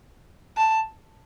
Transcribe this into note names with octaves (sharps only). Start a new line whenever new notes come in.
A5